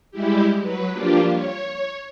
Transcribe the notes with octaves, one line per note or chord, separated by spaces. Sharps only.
G3 G#3 E4 G4
F#3 B4
F3 G3 A#3 D4 F4 G4
C#5